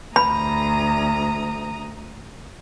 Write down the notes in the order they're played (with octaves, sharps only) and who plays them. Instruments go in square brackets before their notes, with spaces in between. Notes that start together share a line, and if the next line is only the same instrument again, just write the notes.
[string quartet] D2 A#5 D#6 [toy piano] B5